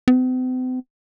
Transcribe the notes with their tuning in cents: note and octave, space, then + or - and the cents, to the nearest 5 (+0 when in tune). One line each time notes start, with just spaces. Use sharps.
C4 -45